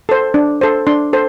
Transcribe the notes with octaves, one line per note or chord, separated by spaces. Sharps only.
A4 C5
D4
A4 C5
D4 C6
A4 C5